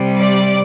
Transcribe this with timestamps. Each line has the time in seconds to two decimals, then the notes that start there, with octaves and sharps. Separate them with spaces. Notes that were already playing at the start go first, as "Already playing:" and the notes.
Already playing: C3 G3
0.19 D5